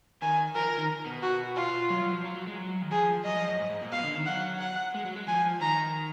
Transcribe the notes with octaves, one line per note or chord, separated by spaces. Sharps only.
D#3 G#5
F3 A#4
D#3
B2
F#4
F4
F#3
F#3
F3
F#3
F#3
G#3
F#3
D#3
F3 G#4
F#3 D#5
F3
F#2
G#2
G#2
A#2
B2 F5
D3
D#3
F#3 F#5
F#5
G#3
F#3
G#3
F3 G#5
D#3 A#5